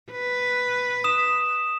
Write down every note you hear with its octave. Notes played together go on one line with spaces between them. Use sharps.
B4
D#6 E7